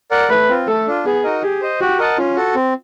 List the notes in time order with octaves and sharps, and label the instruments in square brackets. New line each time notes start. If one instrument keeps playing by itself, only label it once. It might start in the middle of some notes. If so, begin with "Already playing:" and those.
[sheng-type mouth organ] A#4 D5 F#5
[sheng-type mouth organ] A3 [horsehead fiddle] B4
[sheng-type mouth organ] C4 F4
[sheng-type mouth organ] A3 [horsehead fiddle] A4
[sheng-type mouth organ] D4 F4
[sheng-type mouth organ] B3 [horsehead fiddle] G#4
[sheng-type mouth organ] D#4 F#4 A#4 D#5
[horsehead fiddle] G4 [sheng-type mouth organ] G#4
[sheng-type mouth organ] C5 D#5
[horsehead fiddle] F#4 [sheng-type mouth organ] G4
[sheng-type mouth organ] A#4 D#5 F#5 A5
[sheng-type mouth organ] C#4 [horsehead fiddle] F4
[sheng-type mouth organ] F#4 A4
C4